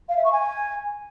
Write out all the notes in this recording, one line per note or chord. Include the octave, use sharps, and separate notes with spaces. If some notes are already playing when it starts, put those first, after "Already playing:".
F5
E5
C#6
G#5